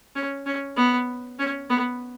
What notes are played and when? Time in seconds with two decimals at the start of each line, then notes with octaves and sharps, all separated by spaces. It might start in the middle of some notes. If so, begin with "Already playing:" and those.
0.16 C#4
0.46 C#4
0.77 B3
1.39 C#4
1.70 B3